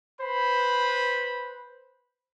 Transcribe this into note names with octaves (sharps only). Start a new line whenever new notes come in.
B4 C5 B5